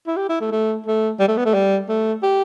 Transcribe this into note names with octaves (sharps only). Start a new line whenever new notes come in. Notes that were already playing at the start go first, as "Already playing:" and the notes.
E4
G4
E4
A3
A3
A3
G3
A3
B3
A3
G3
A3
G4